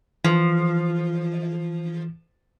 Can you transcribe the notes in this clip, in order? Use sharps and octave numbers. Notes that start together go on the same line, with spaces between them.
E3 F3